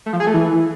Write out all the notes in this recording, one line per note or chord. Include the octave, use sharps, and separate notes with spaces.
A3
F3
G#4
A3
E3